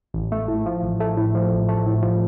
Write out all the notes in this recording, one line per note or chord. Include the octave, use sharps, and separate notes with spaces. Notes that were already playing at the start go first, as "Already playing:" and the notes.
A1
A3
A2
F3
A1
A3
A2
F3
A1
A3
A2
F3